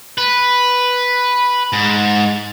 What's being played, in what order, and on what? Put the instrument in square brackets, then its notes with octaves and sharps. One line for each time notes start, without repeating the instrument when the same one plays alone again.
[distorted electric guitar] B4
G#2